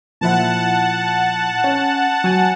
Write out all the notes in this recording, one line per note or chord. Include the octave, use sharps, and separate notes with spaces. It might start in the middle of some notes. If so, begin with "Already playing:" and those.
A#2 F3 E4 F#5 A5
C#4
F#3 G#5